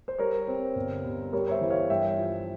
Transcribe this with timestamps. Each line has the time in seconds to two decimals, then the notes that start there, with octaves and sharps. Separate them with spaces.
0.08 C5
0.18 G3 A#4 C#5
0.48 C4
0.75 G1
1.04 G1
1.32 G3 A#4 C#5
1.48 C#5
1.51 C5 E5
1.61 E3
1.70 C#5 F5
1.90 G2 E5 G5
2.18 F3